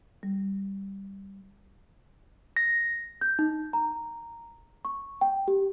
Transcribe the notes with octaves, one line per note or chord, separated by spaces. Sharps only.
G3
A#6
G6
D#4
A#5
C#6
G5
G4